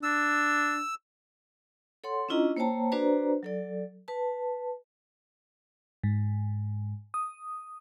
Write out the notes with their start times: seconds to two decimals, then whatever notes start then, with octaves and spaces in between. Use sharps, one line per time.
0.03 D4 E6
2.04 A4 C#5 F#5 C6
2.29 C#4 D4 E4 F4 D#5 A#5
2.57 A#3 C5 C#5 G5 A5 A#5
2.92 D4 F#4 B4 C5 D5 A#5
3.43 F#3 A4 D5
4.08 B4 A5
6.03 G#2
7.14 D#6